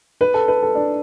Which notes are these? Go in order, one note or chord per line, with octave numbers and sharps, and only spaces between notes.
B4
A4
B4
A4
D4